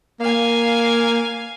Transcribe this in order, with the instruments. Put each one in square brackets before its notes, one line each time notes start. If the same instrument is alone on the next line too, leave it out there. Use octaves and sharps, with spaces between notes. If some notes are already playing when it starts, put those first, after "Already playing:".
[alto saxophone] A#3 [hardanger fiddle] F5 G#5